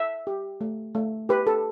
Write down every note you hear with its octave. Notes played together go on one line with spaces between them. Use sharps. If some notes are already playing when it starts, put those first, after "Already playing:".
Already playing: E5
G4
A3
A3
G4 B4
A4